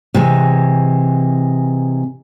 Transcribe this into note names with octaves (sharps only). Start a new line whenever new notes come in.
C3 E3 G#3